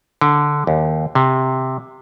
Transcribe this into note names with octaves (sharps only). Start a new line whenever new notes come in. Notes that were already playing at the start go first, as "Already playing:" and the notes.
D3
D#2
C3